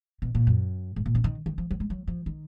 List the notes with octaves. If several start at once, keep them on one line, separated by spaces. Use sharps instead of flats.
B2
A#2
F#2
G#2
A#2
C#3
D#3
D#3
F3
F#3
G#3
F#3
F3
D#3